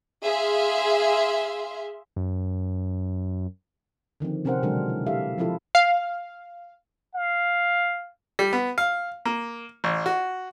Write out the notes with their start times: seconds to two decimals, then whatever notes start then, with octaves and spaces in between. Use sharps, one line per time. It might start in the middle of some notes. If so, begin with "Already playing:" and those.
0.23 G#4 E5 F5 C6
2.16 F#2
4.20 D3 D#3 F3 C4
4.45 C3 C4 C#4 A#4 C5 F#5
4.63 B2 D3 F#3 G#3 D4 A#4
4.89 E4
5.06 E4 G4 A4 E5 F5
5.38 F3 C4 E4 F4 A4
5.75 F5
7.15 F5
8.39 G3
8.53 B3
8.78 F5
9.25 A#3
9.84 A1
10.06 F#4